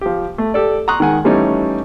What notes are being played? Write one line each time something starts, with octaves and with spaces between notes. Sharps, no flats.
F3 G4
A3
G4 A4 D5
A#5 C6 C#6 D#6 F#6
D#3 G#3 F#5 G#5
E3 G3 A3 C#4 D#4